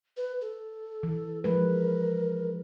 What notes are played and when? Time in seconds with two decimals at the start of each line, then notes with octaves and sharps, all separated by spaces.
0.17 B4
0.41 A4
1.03 E3
1.44 F3 G#3 A#4 B4